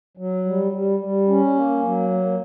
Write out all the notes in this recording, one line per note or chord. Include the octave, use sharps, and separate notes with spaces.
F#3
G3
G3
G3
C#4
A#3
F#3
A#3